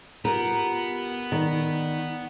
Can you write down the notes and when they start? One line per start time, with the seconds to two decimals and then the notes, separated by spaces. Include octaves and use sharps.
0.25 B3 F4 G4 A#4
1.32 D#3 D5